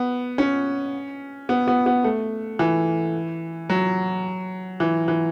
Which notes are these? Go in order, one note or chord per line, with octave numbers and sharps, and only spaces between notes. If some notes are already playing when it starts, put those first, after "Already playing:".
Already playing: B3
C#4
B3
B3
B3
A3
E3
F#3
E3
E3